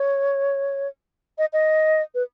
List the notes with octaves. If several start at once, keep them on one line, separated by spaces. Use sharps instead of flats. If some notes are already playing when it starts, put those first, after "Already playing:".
Already playing: C#5
D#5
D#5
B4